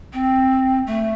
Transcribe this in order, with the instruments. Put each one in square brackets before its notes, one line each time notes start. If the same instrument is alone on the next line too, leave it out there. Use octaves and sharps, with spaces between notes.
[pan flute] C4
A3